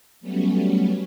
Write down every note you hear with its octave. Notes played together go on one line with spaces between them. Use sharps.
F#3 G3 A3 B3 C#4